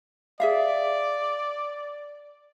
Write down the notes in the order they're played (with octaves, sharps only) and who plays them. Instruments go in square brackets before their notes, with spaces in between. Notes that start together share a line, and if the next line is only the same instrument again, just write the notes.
[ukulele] G#4 E5 F5 [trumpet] D5